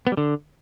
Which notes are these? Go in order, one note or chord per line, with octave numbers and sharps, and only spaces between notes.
B3
G3
D3